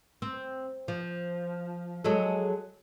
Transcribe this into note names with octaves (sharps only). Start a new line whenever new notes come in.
C4
F3
F#3 G#3 A4